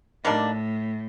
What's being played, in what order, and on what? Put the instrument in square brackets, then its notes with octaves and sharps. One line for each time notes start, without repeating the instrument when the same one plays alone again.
[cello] A2 [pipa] D#3 G3 A#3 D4